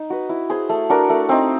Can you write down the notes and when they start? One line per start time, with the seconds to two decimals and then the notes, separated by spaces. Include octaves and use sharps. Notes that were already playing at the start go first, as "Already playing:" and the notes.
Already playing: D#4
0.10 F#4 B4
0.29 E4
0.50 G#4 C5
0.69 A3
0.90 D4 F#4 A#4
1.10 A3
1.29 C4 D#4